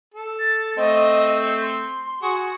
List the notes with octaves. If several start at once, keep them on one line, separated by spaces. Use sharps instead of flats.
A4
A6
A3 C4 D#5
C6
F#4 G#4